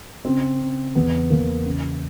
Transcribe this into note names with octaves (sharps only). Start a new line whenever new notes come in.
C#3 C4
C#3
E2 B3
E2 A#3
C#3